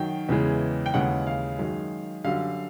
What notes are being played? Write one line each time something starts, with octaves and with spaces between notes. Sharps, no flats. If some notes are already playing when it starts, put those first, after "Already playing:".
Already playing: F#2 D#3 F#3 G5
E2 C#3 E3 G#3
G5
D#2 C#3 E3 G#3 F#5
F5
F#2 D#3 G#3
F#2 D3 G3 F5